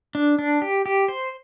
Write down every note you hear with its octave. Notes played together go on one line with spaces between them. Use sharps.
D4
D4
G4
G4
C5